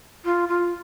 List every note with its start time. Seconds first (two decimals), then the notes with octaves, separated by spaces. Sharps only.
0.25 F4
0.49 F4